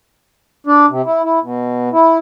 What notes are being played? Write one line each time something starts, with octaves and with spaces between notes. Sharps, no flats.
D4
C3
E4
E4
B2
E4